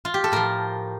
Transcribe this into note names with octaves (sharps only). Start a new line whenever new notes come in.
F4
G4
A4
A2 F3 A#4